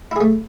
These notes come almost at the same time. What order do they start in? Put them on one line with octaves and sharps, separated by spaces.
E4 G#4 A3